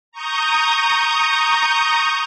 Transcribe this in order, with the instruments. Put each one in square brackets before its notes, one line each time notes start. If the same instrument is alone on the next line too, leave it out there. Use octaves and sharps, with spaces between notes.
[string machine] A#5 C#6 D#6 G6